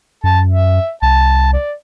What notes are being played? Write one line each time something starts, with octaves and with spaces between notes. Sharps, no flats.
F#2 A5
E5
C2 A5
D5